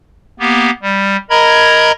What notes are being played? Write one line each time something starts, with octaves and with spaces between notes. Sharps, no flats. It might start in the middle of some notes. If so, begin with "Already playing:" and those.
A#3 B3 G4
G3
A#4 D#5 A#5 B5 G#6